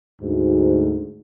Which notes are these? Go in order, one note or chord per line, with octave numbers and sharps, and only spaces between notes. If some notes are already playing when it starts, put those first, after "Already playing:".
D2 G#2